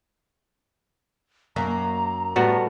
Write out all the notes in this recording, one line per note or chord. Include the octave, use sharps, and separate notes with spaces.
F#2 A#3 A#5
A2 G3 B3 F#4